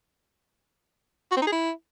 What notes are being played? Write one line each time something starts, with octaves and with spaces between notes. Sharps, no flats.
F#4
C4
D#4
G#4
E4